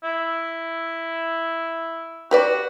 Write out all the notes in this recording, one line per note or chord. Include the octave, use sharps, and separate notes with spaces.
E4
F#4 G4 B4 D5